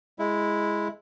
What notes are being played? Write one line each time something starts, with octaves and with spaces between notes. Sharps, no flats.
G#3 E4